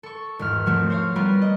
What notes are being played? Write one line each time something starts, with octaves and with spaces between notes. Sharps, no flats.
A4 C#6
G#1 E2 F6
F3 F#3 A3 C4
C5 C#5 F5
G3 B3 F4 A#4
D#5